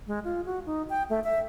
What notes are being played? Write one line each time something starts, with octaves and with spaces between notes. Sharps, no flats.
G#3
F4
F#4
D#4
G5
A3
E5